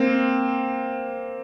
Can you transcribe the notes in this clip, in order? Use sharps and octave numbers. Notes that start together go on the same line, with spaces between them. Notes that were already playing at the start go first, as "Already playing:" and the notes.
Already playing: A#3 C4